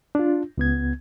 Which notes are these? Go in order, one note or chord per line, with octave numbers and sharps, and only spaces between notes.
D4 F4
C#2 B3 G#6